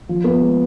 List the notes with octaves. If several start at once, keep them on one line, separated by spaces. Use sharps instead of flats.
F3
B3
G#3